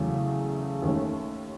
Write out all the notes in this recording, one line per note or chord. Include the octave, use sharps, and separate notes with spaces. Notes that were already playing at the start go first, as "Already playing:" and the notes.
Already playing: E2 C#3 F#3 A3
D#2 D#3 A3 C#4